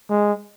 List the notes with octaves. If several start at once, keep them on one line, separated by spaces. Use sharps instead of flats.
G#3